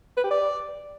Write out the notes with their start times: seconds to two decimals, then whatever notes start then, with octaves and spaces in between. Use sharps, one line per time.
0.17 B4
0.24 G4
0.30 D5